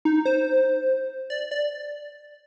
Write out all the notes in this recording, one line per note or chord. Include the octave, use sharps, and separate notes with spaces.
D#4
C5
D5
D5